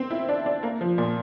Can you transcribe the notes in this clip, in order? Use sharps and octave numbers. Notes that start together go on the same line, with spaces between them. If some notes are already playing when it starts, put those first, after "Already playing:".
Already playing: C4
E4
D4
D4
A#3
F3
A#2